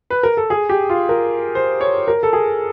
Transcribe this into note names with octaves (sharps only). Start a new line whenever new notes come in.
B4
A#4
A4
G#4
G4
F4
A#4
C5
C#5
A#4
A4
G#4